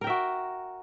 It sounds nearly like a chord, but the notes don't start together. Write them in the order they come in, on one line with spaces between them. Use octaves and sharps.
A#4 G5 E5 F#4